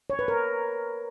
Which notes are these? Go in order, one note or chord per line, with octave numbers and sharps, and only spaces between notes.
C#5
B4
A#4